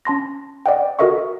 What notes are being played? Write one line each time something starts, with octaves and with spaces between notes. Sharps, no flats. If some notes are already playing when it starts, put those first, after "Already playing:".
C#4 A5 C6 A#6
D5 D#5 F#5 G5
F#4 A4 A#4 D#5 E5 C#6